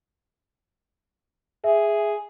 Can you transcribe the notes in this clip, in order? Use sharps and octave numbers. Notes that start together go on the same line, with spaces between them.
G#4 E5